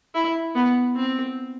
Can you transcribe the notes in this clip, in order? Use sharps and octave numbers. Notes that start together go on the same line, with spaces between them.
E4
B3
C4